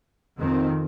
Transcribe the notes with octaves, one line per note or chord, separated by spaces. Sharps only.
F2 D#3 C4